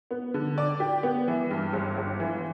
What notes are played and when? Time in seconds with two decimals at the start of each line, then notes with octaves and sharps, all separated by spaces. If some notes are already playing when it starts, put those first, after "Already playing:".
0.11 B3
0.34 D3
0.58 D5
0.80 G4
1.03 B3
1.28 E3
1.51 G2
1.73 G1
1.97 G1
2.20 E3